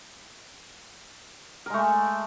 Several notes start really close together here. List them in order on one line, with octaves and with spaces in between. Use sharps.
A#4 G#3 A3